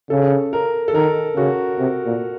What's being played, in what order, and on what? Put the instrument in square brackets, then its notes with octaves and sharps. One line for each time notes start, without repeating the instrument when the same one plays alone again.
[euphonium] C#3 [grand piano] A4
[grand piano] A#4
A4
[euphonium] D#3 [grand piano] A#4
[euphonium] C#3 [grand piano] F#4
[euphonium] C3
A#2